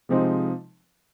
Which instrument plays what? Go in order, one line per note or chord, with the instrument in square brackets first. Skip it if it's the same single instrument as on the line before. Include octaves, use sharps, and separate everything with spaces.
[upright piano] C3 F3 G#3 C4 D#4